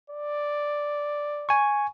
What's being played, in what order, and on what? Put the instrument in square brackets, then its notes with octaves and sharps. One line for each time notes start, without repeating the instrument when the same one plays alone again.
[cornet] D5
[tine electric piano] G#5 C#6